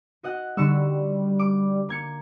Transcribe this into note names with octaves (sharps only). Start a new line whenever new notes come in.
F#4 D#5 F#5
D3 G3 C#6 E6
D6
A#3 G#6 C#7